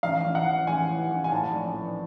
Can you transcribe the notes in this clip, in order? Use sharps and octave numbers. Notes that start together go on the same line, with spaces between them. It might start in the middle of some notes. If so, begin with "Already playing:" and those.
A1 F5
A1
F#5
E3
A1 G#5
E3
A1
G#5
A2 A5
A#1
E3